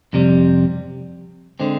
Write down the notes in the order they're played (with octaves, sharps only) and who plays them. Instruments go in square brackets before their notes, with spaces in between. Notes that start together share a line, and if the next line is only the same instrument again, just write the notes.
[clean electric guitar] F2 C3 G3
D3 G#3 C4